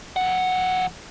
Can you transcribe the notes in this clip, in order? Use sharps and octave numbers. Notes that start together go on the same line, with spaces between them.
F3 F#5